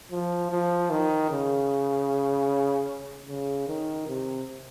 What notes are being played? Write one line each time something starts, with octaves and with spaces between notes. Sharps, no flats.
F3
F3
D#3
C#3
C#3
D#3
C3